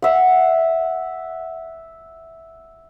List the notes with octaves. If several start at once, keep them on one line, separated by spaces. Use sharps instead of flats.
E5 F#5